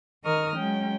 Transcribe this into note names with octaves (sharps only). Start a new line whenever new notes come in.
D#3 A#4 D#5 C#6 D#6 F6
F#3 G#3 C#4 G5